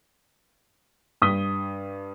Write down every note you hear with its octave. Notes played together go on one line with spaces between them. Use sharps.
G2 D#6 B6 G7